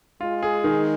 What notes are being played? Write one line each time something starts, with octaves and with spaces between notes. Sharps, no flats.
G#3 F4
G#4
D#3